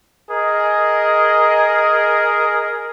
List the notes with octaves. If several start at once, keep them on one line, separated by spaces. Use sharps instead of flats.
G#4 A#4 D#5